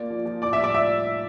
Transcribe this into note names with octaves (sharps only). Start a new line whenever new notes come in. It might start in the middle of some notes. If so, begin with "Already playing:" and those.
Already playing: A#3 F4 D5
F3
F3
A2 D5 D6
E5 E6
G3
D5 D6
F4 E5 E6